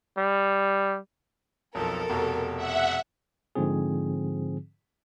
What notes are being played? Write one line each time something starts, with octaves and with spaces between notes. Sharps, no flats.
G3
B1 F2 A4 A#4
F1 B2
E5 F#5
G#2 D3 F3 C4 G#4